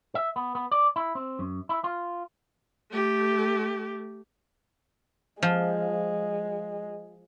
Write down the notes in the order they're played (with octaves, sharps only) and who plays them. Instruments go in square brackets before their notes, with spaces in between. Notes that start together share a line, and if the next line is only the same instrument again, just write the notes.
[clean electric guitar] E5
B3
B3
D5
E4
C4
F#2
E4
F4
[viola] A3 G4
[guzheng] F3 [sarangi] G#3